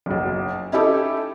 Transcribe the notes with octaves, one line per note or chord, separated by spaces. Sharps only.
F#1 B1
C#4 D#4 E4 G4 A4